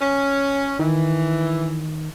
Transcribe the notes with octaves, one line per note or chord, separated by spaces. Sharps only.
C#4
D#3 E3